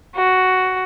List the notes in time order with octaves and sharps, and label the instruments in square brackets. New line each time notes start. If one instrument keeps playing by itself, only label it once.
[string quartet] F#4